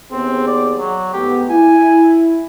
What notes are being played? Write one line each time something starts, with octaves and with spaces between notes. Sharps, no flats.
D#2 B3 C4 G#4
D5
F#3
G#2 A3 B3 G4
E4 G#5